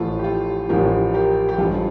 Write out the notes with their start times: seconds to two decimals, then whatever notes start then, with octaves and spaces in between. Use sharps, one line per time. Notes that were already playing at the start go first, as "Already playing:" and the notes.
Already playing: A1 A2 F3 F4 A4
0.19 G4
0.24 F4 A4
0.69 A1 A2 F3 G4 A#4
1.14 G4 A#4
1.49 G4
1.58 A1 G2 F3 F4 A4